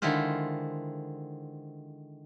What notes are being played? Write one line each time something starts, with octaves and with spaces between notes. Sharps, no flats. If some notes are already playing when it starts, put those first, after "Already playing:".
D3 D#3 G#3 E4 F4 C5